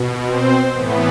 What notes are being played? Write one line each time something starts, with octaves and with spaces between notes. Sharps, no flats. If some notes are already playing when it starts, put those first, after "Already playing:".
Already playing: B2
C4 C5
A2 E3 B3